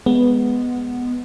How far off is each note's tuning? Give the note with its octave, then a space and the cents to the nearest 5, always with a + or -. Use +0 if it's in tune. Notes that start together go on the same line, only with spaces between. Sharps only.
G#3 +0 B3 +0